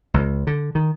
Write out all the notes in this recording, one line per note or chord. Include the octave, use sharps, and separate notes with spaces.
C#2
D3
D#3